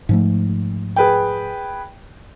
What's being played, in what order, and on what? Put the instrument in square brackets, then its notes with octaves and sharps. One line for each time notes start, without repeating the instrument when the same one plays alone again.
[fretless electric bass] G#2 F3 A3
[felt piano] G#4 B4 G5